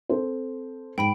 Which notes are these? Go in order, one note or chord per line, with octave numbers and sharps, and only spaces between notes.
C4 A4 C5
G#2 G5 B5 D7